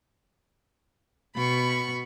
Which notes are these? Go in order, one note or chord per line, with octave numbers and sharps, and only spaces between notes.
B2 B5 C#6